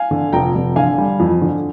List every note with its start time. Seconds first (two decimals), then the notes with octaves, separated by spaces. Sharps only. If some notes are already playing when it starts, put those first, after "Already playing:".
Already playing: F5 G#5
0.11 D3
0.33 F1 G5 A#5
0.55 F1
0.76 D3 F5 G#5
0.98 G3
1.20 F2
1.42 D3